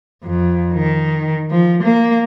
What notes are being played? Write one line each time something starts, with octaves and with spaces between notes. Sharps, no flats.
F2
D#3
F3
A#3